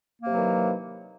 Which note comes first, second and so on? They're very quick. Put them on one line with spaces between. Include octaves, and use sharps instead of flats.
A#3 C3 F#3 E3 D#3